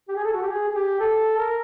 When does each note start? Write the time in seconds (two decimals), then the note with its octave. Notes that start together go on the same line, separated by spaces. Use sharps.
0.08 G4
0.16 G#4
0.24 A4
0.33 F#4
0.42 G4
0.49 G#4
0.68 G#4
0.75 G4
1.00 A4
1.37 A#4